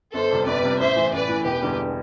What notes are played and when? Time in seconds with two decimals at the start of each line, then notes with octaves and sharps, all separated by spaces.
0.14 G1 A4 C5
0.31 F2 C3 G3
0.46 G1 B4 D5
0.63 F2 C3 G3
0.79 A1 C5 E5
0.96 A2 E3
1.13 A1 B4 D5
1.29 A2 E3
1.45 E1 G4 B4
1.62 E2 D3 G3